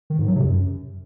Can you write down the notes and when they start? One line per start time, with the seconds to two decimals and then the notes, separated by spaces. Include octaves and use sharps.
0.10 D#3
0.19 G#2
0.27 F#3
0.36 C3
0.45 F#2